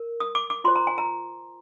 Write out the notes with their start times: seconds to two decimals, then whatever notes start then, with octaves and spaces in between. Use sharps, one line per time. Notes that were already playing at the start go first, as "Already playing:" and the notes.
Already playing: A#4
0.20 D#6
0.35 D6
0.50 D6
0.64 F4 C5 C6
0.76 A#5
0.87 G#5
0.98 A#5